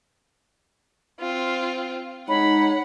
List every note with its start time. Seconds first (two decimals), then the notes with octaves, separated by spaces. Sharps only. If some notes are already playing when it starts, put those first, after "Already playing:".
1.20 C4 F4
2.29 G#3 D#4 C#5 F#5 B5